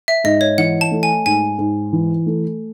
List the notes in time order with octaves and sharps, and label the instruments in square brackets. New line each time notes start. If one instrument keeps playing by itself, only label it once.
[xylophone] E5
[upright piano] G#2 [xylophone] D#5
[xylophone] C#5
[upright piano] E3 [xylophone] F#5
[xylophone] A5
[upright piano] A3
[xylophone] G#5
[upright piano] G#2 [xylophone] G#5
[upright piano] G#2
E3
A3